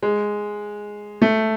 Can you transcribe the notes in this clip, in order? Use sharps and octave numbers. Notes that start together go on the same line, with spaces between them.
G#3
A3